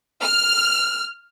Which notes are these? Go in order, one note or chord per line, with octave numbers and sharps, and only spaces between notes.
F6